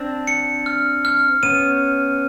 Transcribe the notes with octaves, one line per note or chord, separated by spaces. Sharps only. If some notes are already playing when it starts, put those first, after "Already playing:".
Already playing: C4 D4
C#7
F6
F6
B3 C#4 D#7